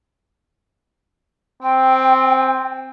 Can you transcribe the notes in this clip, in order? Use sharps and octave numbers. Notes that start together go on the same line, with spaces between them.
C4 G5